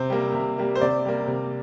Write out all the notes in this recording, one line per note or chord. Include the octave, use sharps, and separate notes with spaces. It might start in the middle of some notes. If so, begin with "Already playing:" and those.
Already playing: C3 C5
G3 A#3
C3
G3 A#3
C5
C3 D5
G3 A#3
C3